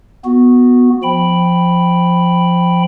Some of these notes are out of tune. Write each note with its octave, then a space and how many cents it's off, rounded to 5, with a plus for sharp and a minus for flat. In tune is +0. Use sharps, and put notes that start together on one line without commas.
B3 +0 F#4 -15
F3 +0 G5 +0 B5 +0